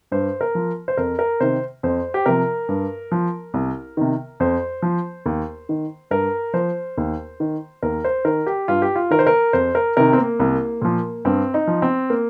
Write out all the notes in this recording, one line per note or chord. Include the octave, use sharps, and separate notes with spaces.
G2 C5
A#4
F3
C5
F2 A#4
A#4
C3 D#3 C5
F2 C5
G4
C3 F3 A#4
G2
F3
C2
C3 D#3
F2 C5
F3
D#2
D#3
G2 A#4
F3 C5
D#2
D#3
D#2 A#4
C5
D#3 A#4
G4
G2 F4
G4
F4
D#3 A#4
C5
A#4
F2 C5
A#4
C3 D#3 A#4
C4
A#3
C2
A#2 F3
G2 C4
D#4
F3
C4
A#3